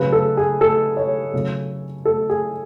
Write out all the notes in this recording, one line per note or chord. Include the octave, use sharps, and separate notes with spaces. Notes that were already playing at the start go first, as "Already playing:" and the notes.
Already playing: C#3 F#3 B4
A4
G#4
A4
C#5
C#3 F#3
A4
G#4